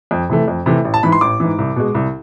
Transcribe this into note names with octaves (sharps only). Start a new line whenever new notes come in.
F2
C3 E3 A3
F2
C3 E3 A3
A1
A5
G#2 E3 B5
C6
A1 D6
G#2 E3
C2
B2 G#3
C2